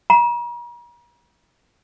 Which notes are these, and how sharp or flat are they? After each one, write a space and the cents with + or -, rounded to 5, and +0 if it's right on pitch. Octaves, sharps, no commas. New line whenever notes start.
A#5 +40